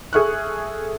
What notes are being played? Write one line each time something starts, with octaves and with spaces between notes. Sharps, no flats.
G#4 A4 E5 C#6 F6 F#6